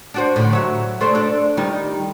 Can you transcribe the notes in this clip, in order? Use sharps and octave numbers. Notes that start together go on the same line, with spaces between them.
D4 F#4 C5
A2 D3
F#3 E5
A3 D4 C5
D4 A4
D#3 G3 D#4